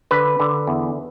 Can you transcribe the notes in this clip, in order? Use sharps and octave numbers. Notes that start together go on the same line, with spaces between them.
D3 B4
D3
E2